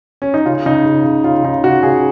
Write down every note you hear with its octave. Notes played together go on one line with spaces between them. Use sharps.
C#4
D#4
C#3 F4
C#3 D#4
C#3
C#3
C#3 F4
C#3 D#4
C#3 F#4
C#3 G#4